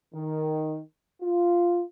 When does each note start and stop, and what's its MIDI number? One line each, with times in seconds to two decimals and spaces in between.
0.14 0.80 51
1.22 1.82 65